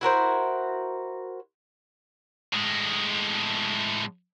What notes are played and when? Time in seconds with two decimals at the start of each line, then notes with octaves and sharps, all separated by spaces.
0.01 E4 F#4 A#4 C5
2.54 A2 G#3